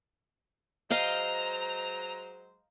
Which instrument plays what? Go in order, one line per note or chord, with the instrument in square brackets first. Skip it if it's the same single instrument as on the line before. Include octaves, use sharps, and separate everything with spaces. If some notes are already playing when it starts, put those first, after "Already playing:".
[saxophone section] F#3 G#3 C5 [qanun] D#5 F5 G5 [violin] A#5